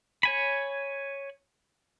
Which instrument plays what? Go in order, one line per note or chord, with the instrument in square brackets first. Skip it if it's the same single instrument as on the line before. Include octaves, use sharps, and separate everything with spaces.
[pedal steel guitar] C#5 G#5 B5